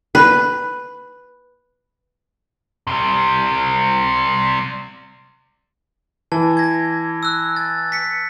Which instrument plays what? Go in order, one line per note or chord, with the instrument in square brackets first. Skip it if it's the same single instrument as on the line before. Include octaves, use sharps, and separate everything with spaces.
[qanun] B4
[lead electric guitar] C3 G3
[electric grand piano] E3 [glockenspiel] A5
[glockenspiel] G#6 A#6
E6 F#6
A6
B6 C#7